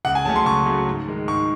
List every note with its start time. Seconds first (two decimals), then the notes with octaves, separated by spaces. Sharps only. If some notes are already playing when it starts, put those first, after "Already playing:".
0.05 C#2 F#5
0.15 G#5
0.25 C#3 F#3 A3 C#4 A5
0.36 C6
0.46 C#2 C#6
0.66 C#3 F#3 A3 C#4
0.87 G#2
1.08 D#3 G#3 D#4
1.28 G#2 C#6